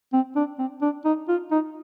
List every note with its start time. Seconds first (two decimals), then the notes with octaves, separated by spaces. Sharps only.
0.13 C4
0.36 D4
0.59 C4
0.82 D4
1.05 D#4
1.29 F4
1.51 D#4